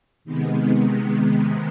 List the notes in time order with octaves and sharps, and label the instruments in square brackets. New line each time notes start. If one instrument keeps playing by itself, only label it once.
[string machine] C3 D#3 G#3 B3